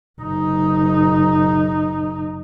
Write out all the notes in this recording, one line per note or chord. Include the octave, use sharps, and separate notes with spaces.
F#1 D#4